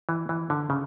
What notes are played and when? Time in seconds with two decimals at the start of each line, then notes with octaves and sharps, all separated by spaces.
0.09 E3
0.29 E3
0.50 D3
0.70 C#3